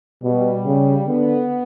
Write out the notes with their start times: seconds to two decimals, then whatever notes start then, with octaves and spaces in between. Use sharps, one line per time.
0.23 B2 G3
0.65 C#3
1.07 D3 B3